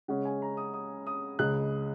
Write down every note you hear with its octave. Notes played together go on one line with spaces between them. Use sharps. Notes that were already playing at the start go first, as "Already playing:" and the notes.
C#3 G#3 C#4 F#5
G#5
A#5
D#6
D#6
D#6
C#2 C#3 G#3 F#6